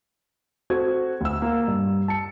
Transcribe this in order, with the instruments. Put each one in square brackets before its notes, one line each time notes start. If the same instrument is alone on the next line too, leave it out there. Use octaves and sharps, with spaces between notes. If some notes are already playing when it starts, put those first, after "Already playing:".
[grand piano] C4 F#4 A4 G#6
D2 E6
A#3
G2
A5 C#7